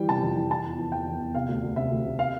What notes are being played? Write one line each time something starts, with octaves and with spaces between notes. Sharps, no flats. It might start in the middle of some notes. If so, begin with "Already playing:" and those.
Already playing: E3 G3 G5
C3 A5
F2
E3
E3 A5
E2
E3
E2 G5
E2
E2
C3 F5
D2
D2
C3 E5
D2
C3
F5